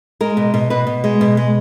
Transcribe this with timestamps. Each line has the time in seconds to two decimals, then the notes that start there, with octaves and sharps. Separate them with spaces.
0.21 G#3 A#4
0.37 B2
0.54 B2
0.70 B2 B4
0.87 B2
1.04 G#3
1.21 B2
1.37 G#3